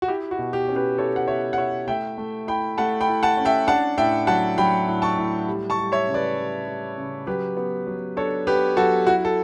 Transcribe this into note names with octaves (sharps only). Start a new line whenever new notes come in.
F#4
E4 G4
F#4
B2
G4
C#4
G4 B4
E4 A4 C#5
F#5
B2 C#5 E5
F#5
E4 C#5 E5
A3 E5 G5
A3
E4 G5 B5
A3 F#5 A5
G5 B5
E4
F#5 A5
C#4
E5 G5
D4 F#5 A5
A2 E5 G5
F#3 F#5 A5
F#3 G5 B5
A2
A5 C#6
A2
G3
A5 C#6
G3
C#5 E5
C#3
B4 D5
G3
G3
C#3
F#3 G4 B4
B3
F#3
D4 A4 C#5
B3 G4 B4
F#3 F#4 A4
E4 F#4
A4